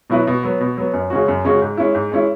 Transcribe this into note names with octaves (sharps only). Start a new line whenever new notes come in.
B2 F#3 E4 B4
B2
F#3 B3
B2
F#3 B3
F#2
C#3 G#3 C#4 F#4
F#2
C#3 G#3 C#4 F#4
G#2
G#3 C#4 E4
G#2
G#3 C#4 E4